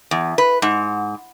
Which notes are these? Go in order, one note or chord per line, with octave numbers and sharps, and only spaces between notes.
E2
B4
G#2